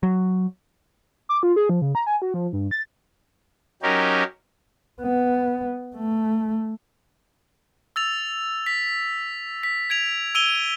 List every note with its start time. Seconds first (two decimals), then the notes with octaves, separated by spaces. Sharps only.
0.03 F#3
1.29 D6
1.43 F4
1.56 G#4
1.69 F3
1.82 C#3
1.95 A#5
2.07 G#5
2.22 F#4
2.34 F3
2.53 G2
2.71 A6
3.82 F#3 C#4 D#4 G4 A#4
5.02 B3
5.96 A3
7.96 E6 A6 F7
8.66 B6
9.63 B6
9.90 G#6 D7 F7
10.35 E6 D7 D#7 F7 G7